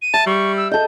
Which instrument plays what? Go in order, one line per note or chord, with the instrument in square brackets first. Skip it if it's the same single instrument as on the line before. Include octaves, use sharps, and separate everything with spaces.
[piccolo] D#7
[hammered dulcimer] E5 [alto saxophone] A5
[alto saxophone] G3 [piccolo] C#6
[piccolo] E6
[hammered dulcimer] A4 D#5 [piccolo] G6